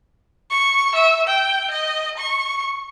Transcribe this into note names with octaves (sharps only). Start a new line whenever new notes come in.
C#6
E5
G5
D#5
C#6